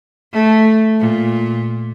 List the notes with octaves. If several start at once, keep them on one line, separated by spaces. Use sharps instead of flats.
A3
A#2